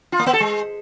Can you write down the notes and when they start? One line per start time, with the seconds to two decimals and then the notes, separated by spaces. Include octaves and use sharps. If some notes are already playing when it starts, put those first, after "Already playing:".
0.12 F4
0.19 A#3
0.26 B3
0.33 A4
0.40 G#3